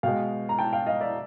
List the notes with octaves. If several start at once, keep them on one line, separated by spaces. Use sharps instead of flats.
B2 G#3 F5 G5
A#5
G5 A5
F5 G5
D#5 F5
D5 E5